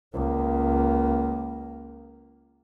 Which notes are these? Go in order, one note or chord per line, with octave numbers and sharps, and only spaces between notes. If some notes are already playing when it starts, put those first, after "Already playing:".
C#2 A#3